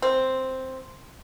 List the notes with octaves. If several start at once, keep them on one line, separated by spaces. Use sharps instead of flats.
C4